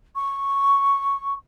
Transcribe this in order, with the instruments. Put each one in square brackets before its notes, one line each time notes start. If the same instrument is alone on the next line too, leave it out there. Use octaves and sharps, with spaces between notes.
[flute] C#6